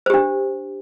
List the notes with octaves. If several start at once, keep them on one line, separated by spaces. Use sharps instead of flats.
D4 G4 C5